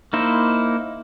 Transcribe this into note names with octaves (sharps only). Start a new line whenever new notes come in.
A#3 D#4 E4 C5